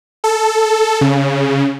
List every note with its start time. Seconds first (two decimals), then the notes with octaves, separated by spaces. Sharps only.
0.24 A4
1.01 C#3